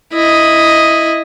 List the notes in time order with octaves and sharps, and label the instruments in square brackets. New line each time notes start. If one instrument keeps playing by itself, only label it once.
[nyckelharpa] E4 D#5